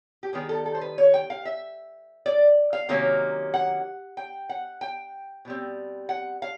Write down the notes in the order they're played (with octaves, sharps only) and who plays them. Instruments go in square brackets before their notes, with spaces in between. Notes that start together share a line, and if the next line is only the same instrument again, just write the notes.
[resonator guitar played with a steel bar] G4
D#3 G3 B3 G#4
A4
A4
C5
B4
C#5
G5
F5
E5
D5
F5
C3 D#3 F#3 A#3 C#4
F#5
G5
F#5
G5
B2 G3 C4
F#5
F5